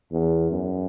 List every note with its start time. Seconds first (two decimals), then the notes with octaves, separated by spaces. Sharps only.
0.12 E2
0.52 F#2